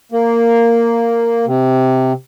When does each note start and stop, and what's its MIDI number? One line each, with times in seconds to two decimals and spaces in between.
0.12 1.46 58
1.47 2.12 48